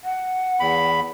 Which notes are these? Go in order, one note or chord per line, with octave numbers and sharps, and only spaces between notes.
F#5
E2 B5